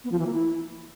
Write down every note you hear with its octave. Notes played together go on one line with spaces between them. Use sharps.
B3
F3
E3
A#3
E4